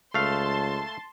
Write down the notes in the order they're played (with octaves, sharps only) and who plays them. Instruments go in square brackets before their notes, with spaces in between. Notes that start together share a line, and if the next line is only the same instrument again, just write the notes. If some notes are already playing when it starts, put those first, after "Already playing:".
[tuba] C#2 [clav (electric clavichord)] A3 F5 [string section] A5 C6